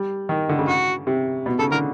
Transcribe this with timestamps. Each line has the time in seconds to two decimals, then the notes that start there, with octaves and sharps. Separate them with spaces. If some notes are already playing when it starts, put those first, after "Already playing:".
Already playing: G3
0.29 D#3
0.49 D3
0.59 C#3
0.68 F#4
1.07 C3
1.46 B2
1.59 C#3 A4
1.72 D3 A#4